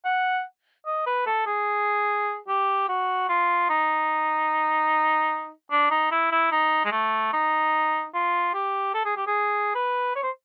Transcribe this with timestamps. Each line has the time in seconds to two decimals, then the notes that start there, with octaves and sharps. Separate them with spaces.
0.05 F#5
0.86 D#5
1.06 B4
1.26 A4
1.47 G#4
2.48 G4
2.89 F#4
3.29 F4
3.70 D#4
5.71 D4
5.91 D#4
6.11 E4
6.32 E4
6.52 D#4
6.85 G#3
6.92 A3
7.33 D#4
8.14 F4
8.54 G4
8.94 A4
9.05 G#4
9.17 G4
9.27 G#4
9.75 B4
10.16 C#5
10.23 C5